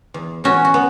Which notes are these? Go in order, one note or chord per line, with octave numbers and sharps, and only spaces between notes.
E2
E2 C#4 F#4
F#4
B3